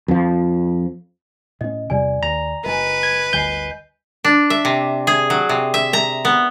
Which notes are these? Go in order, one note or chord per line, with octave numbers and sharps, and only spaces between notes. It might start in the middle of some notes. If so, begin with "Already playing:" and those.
F2 F3
A2 C#4 D#5
E2 C3 G3 D5 G#5
D#2 A#5
F#1 B4 D#5 G#5
G#6
G1 D2 G2 D#5 G#5 G6 C7
D4
E5
C3
G#4
F#3
C3
E5
A#5
B3